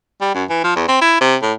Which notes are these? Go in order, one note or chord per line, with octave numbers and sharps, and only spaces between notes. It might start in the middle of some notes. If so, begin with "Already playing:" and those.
G3
F#2
E3
F3
E2
C4
E4
C3
A2